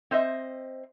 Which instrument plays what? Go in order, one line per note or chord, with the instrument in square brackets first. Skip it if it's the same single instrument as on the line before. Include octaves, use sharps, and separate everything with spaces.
[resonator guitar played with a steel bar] C4 C5 D#5 E5